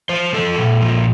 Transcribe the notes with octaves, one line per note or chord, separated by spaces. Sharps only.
F3 C5
F3 A4
A#2
F3